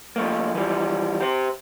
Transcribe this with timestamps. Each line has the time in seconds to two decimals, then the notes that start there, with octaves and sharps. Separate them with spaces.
0.16 F3 A3 A#3
0.55 E3 F3 G3
1.21 G4 C5